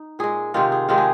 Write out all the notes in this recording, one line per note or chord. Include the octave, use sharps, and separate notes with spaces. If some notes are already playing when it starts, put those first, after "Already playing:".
Already playing: D#4
A#2 G#3 G#4
C3 D#3 G#3 F4
G#4
C3 D#3 G#3 F4
G#4